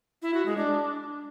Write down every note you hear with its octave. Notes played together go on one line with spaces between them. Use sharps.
E4
F#4
G#3
D4